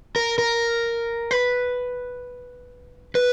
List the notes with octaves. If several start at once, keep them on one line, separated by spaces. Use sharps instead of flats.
A#4
A#4
B4
B4